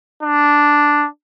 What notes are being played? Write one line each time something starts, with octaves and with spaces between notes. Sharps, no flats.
D4